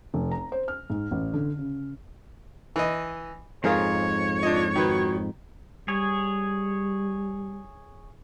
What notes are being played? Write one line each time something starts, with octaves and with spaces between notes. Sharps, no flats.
F1
A#5
C5
F6
G#2
A1
D3
C#3
E3 D#5
F2 G#2 F4 G#4 A#4 C#5
D4 F4 D#5
D#3 F#4 B4
G3 G#4 C#5